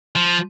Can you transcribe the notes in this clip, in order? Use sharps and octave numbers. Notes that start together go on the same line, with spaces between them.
F3